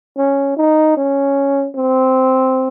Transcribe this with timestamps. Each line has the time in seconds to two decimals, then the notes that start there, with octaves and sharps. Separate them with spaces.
0.17 C#4
0.57 D#4
0.97 C#4
1.76 C4